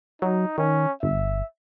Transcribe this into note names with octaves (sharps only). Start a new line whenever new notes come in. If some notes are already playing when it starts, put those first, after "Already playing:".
F#3 D#4
D#3 C#4
G1 E5